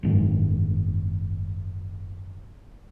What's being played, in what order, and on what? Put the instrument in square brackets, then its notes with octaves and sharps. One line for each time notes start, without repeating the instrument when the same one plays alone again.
[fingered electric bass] F#1 G#2 D#3 D4